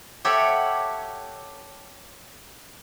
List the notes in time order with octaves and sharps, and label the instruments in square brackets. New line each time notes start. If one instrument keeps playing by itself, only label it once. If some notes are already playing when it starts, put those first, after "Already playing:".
[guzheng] G4 A4 C#5 E5 F#5